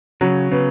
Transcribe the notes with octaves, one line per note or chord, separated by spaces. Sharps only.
C#3 F#3
C#3 B3